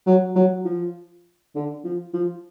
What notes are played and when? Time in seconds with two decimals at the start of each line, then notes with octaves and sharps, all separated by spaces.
0.06 F#3
0.36 F#3
0.65 F3
1.55 D3
1.84 F3
2.14 F3